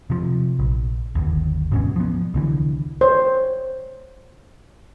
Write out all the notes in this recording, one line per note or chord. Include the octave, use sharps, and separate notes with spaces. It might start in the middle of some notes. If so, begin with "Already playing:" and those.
C3 F3
A#1
G1 D#2
D2 G#2 B2 C#4
F3 B3
C2 D3 E3
C5 C#5